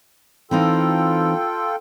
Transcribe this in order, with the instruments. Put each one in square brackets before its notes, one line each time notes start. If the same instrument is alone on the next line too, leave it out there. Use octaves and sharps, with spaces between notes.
[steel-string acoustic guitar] E3 C4 D#4 [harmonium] F4 A4 G5